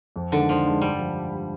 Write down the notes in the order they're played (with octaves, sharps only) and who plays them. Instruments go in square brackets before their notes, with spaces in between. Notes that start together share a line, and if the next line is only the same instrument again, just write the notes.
[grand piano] F2
[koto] D3 [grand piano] D#3 G#3 D4
[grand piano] F2 [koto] F3
[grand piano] D#3 G#3 D4
[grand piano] G2 [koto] G3
[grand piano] F3